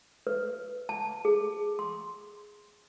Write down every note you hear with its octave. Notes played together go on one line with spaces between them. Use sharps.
B4
A5
G#4
C6